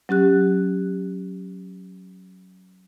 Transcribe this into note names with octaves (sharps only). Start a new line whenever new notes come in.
F#3 C#4 G4 F#6